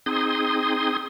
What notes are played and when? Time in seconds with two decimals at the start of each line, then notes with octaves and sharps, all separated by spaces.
0.06 C4 D#4 G#4 C6 D#6